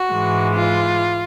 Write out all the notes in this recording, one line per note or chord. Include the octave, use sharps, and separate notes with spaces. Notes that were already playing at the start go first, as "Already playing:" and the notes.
Already playing: F#4
G#2 E3 G#3
F4